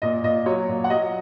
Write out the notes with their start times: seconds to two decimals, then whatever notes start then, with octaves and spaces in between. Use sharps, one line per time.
0.02 A#2 D#5
0.23 A#2 D#5
0.46 F#3 C#5
0.69 A#2
0.84 F#5
0.90 F#3 D#5